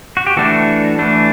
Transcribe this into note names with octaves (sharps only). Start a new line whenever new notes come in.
F#4
G4
E3 A3 D4 F#4 A4
E3 A3 D4